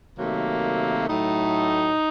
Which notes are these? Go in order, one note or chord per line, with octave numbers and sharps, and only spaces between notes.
C3 D#3 F#3 A3 A#3
A2 F#3 A3 D#4